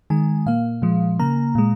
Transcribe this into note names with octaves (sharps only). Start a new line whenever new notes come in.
D#3 G#3 G#5
A#2 A#3 F5
A#2 F3 G#3
C#3 A#3 A#5
A#2 G#3